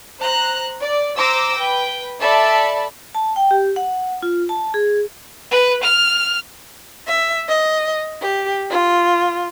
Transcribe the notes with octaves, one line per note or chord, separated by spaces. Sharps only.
C5 A#5 F#6
D5
C5 A#5 D6 E6 A#6
B4 G5
A4 D5 E5 A5 B5
A5
G5
G4
F#5
F4
A5
G#4
B4
F6
E5
D#5
G4
F4